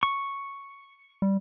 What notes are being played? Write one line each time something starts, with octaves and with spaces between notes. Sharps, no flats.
C#6
G3